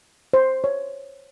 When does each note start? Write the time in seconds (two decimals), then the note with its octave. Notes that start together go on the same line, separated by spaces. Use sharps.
0.33 C5
0.64 C#5